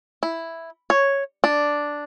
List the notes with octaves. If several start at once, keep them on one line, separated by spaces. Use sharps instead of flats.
E4
C#5
D4